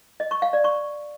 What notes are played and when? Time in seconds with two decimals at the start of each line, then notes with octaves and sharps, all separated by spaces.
0.20 D#5
0.31 C#6
0.42 F5
0.53 D5
0.64 C#6